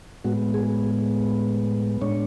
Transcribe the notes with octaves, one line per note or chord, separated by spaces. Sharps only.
A2 G#3 B3 F#4
G#4
A2 G#3 D4 C#5